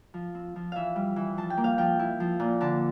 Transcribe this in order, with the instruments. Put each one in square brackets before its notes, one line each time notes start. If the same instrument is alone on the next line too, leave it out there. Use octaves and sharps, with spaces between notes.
[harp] F3
C4
F3
E3 E5 F5
G3
E3
F3 A5
G5
A#3
F5
F3 G5
E4
F3
A#2
D3 A5